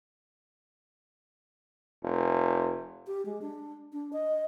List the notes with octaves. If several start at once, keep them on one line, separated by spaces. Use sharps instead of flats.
F1
G4
G#3
D4
D4
D#5